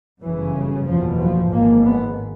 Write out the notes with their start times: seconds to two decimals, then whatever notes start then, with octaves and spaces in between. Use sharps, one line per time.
0.21 G1 F#2 C#3 E3
0.85 F#1 E2 B2 F3
1.19 F3
1.51 G#1 G#2 A#3
1.84 B3